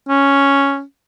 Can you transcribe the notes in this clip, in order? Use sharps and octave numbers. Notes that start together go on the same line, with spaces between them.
C#4